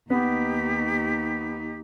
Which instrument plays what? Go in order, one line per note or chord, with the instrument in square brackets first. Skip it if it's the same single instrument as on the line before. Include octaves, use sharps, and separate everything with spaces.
[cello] D#2 D#4 [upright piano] B3 [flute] G4 [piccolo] B6